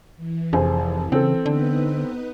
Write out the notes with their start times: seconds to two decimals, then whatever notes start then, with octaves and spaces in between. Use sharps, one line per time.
0.17 E3
0.53 F1 F2 G#4 C5
1.12 C#3 C4 A4
1.46 D3 B3 D#4 B4